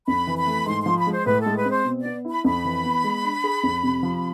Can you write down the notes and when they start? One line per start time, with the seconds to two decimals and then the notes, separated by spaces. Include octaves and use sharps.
0.07 F2 B5
0.27 E3
0.37 B5
0.47 A3
0.66 G#2 C6
0.81 F3 C6
0.97 B5
1.07 G#3 C5
1.25 A2 B4
1.40 A4
1.46 G#3
1.56 B4
1.65 C4
1.71 C5
1.85 B2
2.00 B3 D5
2.25 E4
2.30 B5
2.44 F2 B5
2.65 E3
2.84 B3
3.04 G#3
3.24 D4
3.44 G#4
3.63 F2
3.83 C3
4.03 F3